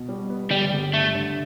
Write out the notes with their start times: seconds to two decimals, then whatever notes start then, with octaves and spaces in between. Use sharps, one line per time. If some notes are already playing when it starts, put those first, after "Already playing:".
Already playing: B2
0.09 G3
0.30 B3
0.51 G1 G3
0.73 G1
0.94 G2 A3
1.15 D3